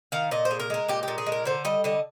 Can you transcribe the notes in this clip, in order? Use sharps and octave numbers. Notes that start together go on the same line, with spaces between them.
D#3 F5
A#2 D#5
C5
G#3
A#4
G#3 A#4
A#2 G4
G4
A#2
G#4
G#3
A#4
D3 C5
G3 D#5
D3 D#5